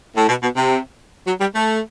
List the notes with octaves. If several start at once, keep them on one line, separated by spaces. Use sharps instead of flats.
A2
B2
B2
C3
F#3
G3
A3